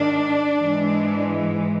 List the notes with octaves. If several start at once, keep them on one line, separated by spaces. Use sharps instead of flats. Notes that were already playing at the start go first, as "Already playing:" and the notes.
Already playing: G#2 D#3 D4
G#2 E3 G#3